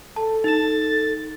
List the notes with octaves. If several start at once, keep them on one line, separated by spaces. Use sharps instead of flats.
A4 A5
D#4 A6 E7